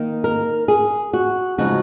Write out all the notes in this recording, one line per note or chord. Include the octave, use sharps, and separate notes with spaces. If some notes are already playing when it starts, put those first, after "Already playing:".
Already playing: D#3 A#3 D#4
A#4
G#4
F#4
C#3 F3 G#3 D#4 F#4